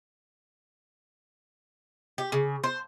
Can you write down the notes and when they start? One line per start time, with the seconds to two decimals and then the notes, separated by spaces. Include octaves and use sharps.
2.18 G4
2.32 C#3
2.64 C5